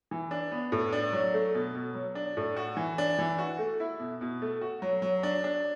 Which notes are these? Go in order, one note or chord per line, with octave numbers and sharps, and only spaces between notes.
E3
D4
B3
A2
D4
F#3
A3
B2
B2
F#3
D4
A2
F#4
E3
D4
E3
F#4
A3
E4
B2
B2
A3
F#4
F#3
F#3
D4
D4